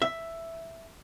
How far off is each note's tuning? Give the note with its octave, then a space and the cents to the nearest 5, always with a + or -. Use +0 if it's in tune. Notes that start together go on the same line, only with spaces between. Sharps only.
E5 +5